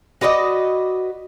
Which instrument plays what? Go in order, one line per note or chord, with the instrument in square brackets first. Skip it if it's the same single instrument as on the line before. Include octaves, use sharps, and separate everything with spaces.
[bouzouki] F#4 B4 D5 D#5